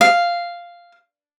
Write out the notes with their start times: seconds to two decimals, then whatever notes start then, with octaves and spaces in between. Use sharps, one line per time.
0.01 F5